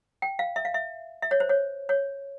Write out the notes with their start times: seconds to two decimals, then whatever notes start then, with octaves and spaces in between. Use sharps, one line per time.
0.22 G5
0.39 F5
0.56 E5
0.65 F5
0.74 E5
1.22 E5
1.31 C#5
1.40 C5
1.49 C#5
1.89 C#5